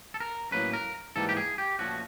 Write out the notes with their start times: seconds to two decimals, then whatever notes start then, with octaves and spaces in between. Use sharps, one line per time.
0.14 A4
0.20 A#4
0.52 A2 F#3 A#3 C#4 B4
0.73 A#4
1.16 G#2 E3 G3 A#3 A4
1.29 G4
1.37 G#4
1.58 G4
1.79 A#2 F3 A3 C#4 F#4